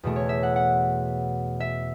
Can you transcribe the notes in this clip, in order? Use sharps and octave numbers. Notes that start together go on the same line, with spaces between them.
E2 B2 A3
C#5
E5
F#5
F#5
E5